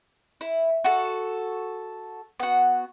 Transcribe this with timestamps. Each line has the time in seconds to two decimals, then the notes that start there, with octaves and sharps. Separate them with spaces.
0.41 E4
0.84 F#4 A4
2.40 B3 F#4